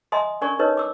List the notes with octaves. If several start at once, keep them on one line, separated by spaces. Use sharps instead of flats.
D#5 E5 G#5 A#5 C6 D#6
C#4 D4 A#4 D5 G#5 C#6
D#4 A#4 B4 C#5 D#5
D6 E6